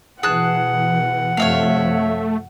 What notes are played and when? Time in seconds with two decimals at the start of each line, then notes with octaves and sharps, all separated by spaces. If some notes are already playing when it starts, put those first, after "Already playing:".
0.23 B2 E3 G#4 F#5 A5 F#6
1.37 F#2 C3 F3 A3 C#5 E5 F5